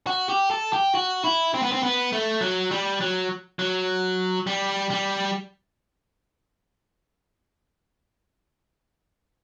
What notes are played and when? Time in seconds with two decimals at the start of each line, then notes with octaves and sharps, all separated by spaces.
0.07 F#4
0.29 G4
0.51 A4
0.73 G4
0.95 F#4
1.24 E4
1.54 C4
1.63 B3
1.72 C4
1.83 B3
2.13 A3
2.41 F#3
2.71 G3
3.01 F#3
3.59 F#3
4.47 G3
4.90 G3